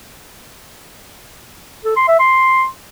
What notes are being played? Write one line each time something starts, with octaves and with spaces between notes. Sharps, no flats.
A4
C6
E5
C6